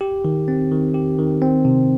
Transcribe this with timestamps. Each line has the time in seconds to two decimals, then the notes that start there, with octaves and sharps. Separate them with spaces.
0.01 G4
0.25 D#3
0.48 C4
0.71 D#3
0.94 G4
1.19 D#3
1.42 C4
1.65 C3